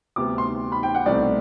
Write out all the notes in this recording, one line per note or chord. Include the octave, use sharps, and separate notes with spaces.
D2 C3 G3 B3 D6
C6
B5
G5
F#5
C2 B2 A3 C4 D5